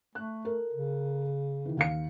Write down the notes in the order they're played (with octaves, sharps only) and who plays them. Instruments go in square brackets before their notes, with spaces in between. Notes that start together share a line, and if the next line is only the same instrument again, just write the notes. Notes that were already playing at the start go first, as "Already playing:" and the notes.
[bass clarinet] A3 [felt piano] F#6
[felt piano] A4 A#4
[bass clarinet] C#3
[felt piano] D#3 E3
D#2 F5 C#7